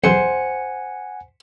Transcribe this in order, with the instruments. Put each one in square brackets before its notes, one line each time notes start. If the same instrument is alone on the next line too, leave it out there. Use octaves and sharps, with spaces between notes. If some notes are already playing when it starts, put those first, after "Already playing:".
[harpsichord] B1 E2 [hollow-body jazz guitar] C5 C6 [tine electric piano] F#5 G#5 C#7